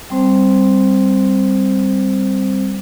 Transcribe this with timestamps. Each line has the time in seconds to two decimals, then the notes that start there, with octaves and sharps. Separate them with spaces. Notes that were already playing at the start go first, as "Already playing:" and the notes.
0.10 G3 C4 C5